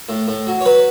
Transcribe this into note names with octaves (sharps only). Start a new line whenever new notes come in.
A2
A2
F#3
C#5
F#3 B4